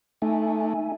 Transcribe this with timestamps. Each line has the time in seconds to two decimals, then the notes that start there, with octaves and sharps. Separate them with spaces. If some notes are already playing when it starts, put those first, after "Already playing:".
0.22 A3 D#4 E5 G#5